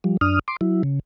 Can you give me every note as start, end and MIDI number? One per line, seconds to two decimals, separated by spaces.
0.04 0.17 53
0.04 0.17 55
0.21 0.39 42
0.21 0.39 62
0.21 0.39 87
0.21 0.39 89
0.48 0.56 84
0.48 0.56 86
0.61 0.83 54
0.61 0.83 64
0.83 0.99 49